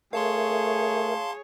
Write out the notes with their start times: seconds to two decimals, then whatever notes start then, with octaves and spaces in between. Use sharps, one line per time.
0.13 A3 G#4 A#4 C#5 E5 F5 A5 C6